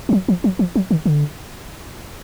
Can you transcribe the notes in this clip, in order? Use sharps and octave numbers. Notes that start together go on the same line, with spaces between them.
F3
F#3
F3
F#3
F3
F#3
D#3
D3